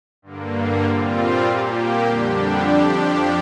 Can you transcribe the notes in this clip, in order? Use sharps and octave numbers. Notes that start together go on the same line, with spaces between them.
G2 D3 A#3
A#2 G3 C4 F4
A#2 A#3 G4
F2 D3 G3 D4 G4
F2 F3 D4 G4